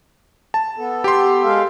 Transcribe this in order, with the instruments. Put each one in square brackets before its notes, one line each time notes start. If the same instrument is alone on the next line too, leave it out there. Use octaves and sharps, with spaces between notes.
[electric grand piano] A5
[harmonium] B3 A4
[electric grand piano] G4 C6
[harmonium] G#3 A4 F5